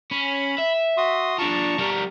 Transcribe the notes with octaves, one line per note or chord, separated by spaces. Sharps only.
C#4 B5
E5
F#4 C6 D#6
D4 F4 A5 A#5 C#6
G3 A#4